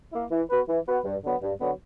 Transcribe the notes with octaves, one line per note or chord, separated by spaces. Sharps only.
A#3 E4
E3
B3 F#4 B4
E3
B3 F#4 B4
G2
D3 F#3 B3
G2
D3 F#3 B3